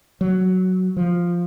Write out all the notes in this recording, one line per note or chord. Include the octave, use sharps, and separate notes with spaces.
F#3
F3